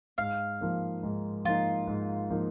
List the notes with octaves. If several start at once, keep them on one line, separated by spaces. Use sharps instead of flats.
G#2 F5
F3 A#3 D#4
G#2
F3 A#3 D#4 F4
G#2
F3 A#3 D#4